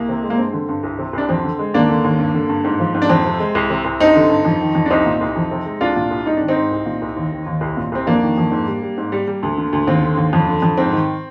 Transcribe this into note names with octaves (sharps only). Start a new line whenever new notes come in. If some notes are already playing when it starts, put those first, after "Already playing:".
Already playing: C2 A#3
C3
G#3
A#3
G2 C4
D3
G2
C2
C3
C2 D4
F2 C4
D3
G#3
D#2 A#3 D4
D3
D#2
G2
D3
G2
G#2
F3
G#2
D4
F2 C4
C3
G#3
C2
C3
C2
G2 C4 D#4
D3
G2
F2
D#3
F2
D4
C2 C4 D#4
A#2
C2
F2
C3
G#3
C2 D4 F4
A#2
C2
G#2 D#4
D#3 D4
C4 D#4
G#2
C2
A#2
C2
D#2
D#3
D#2
C2
A#2
C2 C4
F2 A#3 D4
D#3
F2
G#2
G3
G3
G#2
G3
G3
D2
D3
D2
D#2 C4
D3
D#2
F2
D3
F2
G#2 C4
D#3